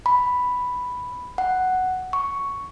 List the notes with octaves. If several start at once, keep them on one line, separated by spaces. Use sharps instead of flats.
B5
F#5
C#6